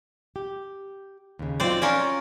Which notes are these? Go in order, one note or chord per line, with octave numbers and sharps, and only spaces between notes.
G4
D#2 C#3
F#3 C4 D#4 F4 C5 D5
C#4 F4 A#4 D5